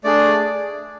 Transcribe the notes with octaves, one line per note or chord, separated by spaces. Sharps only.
A3 D4 G#4 D5